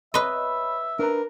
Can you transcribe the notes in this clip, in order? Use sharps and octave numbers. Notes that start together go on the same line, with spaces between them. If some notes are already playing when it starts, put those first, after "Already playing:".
B4 C#5 D#5 E5 B5
D4 A#4 B4 A#5